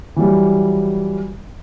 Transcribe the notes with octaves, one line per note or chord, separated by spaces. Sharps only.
E3 F#3 G3